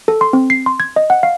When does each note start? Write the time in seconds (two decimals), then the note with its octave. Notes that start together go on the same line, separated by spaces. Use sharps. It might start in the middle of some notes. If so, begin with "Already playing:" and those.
0.08 A4
0.21 C6
0.33 C4
0.50 C7
0.66 C6
0.80 G#6
0.96 D#5
1.10 F#5
1.23 F5